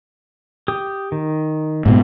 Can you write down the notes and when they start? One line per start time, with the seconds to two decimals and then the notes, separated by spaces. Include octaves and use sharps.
0.68 G4 D#6
1.12 D#3
1.86 G#2 B2